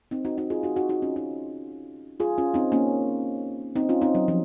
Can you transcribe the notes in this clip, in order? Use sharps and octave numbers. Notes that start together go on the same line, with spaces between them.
C4 D#4
D#4 F#4
D#4 F#4
F4 G#4
D#4 F#4
D#4 F#4
D#4 F#4
C#4 F4
D#4 F#4
F4 G#4
C#4 F4
C4 D#4
A#3 C#4
C4 D#4
C#4 F4
C4 D#4
F#3
F3